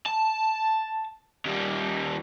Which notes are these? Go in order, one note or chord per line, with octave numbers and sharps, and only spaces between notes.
A5
D#2 G3